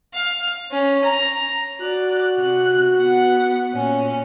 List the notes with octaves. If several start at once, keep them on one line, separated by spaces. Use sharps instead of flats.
F5
C#4
A#5
F#4 D5 F#6
C3 F#6
B3 F#5
A#2 C#4